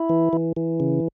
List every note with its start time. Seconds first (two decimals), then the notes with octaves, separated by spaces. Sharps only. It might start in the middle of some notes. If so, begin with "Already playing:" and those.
Already playing: E4
0.09 E3
0.33 E3
0.56 E3
0.80 C#3